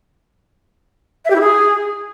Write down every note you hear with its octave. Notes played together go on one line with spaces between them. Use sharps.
E5
G4
E4
G#4